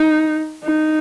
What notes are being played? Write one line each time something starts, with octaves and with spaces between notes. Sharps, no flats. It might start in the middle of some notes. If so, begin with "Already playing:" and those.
Already playing: D#4
D#4